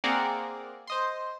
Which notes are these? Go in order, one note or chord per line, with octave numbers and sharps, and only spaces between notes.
A#3 C4 G#4 A#4 D5 F#5
C5 D#5 C6